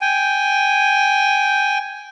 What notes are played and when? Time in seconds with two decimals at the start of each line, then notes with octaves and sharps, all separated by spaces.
0.01 G5 G#5